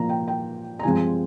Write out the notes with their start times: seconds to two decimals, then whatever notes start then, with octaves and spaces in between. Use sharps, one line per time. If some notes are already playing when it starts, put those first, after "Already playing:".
Already playing: A#2 F3 A#3 A#5
0.09 G5
0.28 G5
0.79 A#5
0.83 G2 F3 G#3 C4 G#5